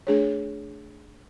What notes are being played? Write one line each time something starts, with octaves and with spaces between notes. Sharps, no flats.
A3 D4 G#4 C#5